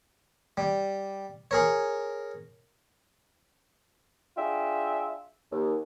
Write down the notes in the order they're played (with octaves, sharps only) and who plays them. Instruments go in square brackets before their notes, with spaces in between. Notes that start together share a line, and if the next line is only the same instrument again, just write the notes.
[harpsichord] G3
G#4 A#4 C#5
[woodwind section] D4 F4 G#4 E5 G5
D#2